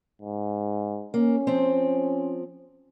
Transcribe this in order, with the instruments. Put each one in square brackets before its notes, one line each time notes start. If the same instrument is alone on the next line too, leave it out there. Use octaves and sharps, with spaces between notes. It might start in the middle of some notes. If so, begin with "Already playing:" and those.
[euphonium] G#2
[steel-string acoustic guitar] A#3 [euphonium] C#4
[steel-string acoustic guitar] F3 C4